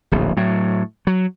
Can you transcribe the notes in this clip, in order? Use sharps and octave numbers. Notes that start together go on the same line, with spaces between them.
D1 A#1
A2 F#3
F#3